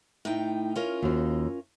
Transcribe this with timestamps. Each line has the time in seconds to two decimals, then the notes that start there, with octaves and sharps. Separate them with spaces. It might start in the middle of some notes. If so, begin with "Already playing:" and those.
0.25 A2 D#4 G5
0.76 C#4 F4 A#4
1.02 D#2 F#4 C5